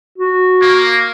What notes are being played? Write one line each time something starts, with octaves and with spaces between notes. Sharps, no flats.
F#4
A#3